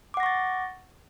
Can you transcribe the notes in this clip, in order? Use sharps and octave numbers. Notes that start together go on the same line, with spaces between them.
F#5 C#6 D6 A6 A#6